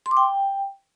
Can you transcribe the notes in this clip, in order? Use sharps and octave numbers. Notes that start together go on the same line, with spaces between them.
C6
D6
G5